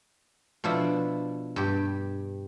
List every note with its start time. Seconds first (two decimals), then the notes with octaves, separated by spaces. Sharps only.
0.64 B2 F3 D4 E4
1.56 G2 G4